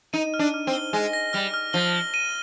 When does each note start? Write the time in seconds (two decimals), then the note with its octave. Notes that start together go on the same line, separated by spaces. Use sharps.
0.13 D#4 D#7
0.34 F6
0.39 D4
0.54 F6
0.67 C4
0.73 G7
0.93 G#3 A#6
1.13 A#6
1.33 G3 F6
1.54 F6
1.73 F3 G7
1.94 G7
2.14 D#7